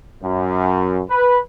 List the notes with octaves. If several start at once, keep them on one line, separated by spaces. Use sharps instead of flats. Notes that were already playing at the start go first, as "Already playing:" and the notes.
F#2
B4